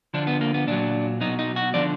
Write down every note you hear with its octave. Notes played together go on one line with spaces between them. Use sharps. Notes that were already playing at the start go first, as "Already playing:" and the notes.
D3 F3 D4
B3
A#3
B3
A#2 F#3 D4
B2 F#3 D#4
D#4
F#4
D3 F3 D5